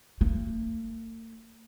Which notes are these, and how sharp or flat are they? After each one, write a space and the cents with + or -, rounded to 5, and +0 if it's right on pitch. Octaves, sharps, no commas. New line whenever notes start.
A3 +45